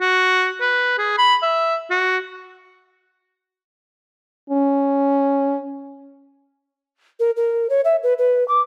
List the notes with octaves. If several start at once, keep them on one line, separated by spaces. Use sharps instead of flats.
F#4
B4
G#4
B5
E5
F#4
C#4
A#4
A#4
C#5
E5
B4
B4
D6